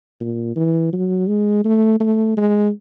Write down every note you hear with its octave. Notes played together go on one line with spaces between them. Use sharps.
A#2
E3
F#3
G#3
A3
A3
G#3